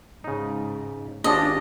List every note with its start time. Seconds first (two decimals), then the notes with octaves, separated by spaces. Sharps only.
0.24 G#2 C#3 D#4
1.24 G#1 C#4 D4 F4 G4 D#5 A5